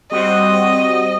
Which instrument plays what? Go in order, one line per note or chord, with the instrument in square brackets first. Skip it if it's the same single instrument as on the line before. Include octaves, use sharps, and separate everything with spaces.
[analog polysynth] G3 C4 F#4 [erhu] D#5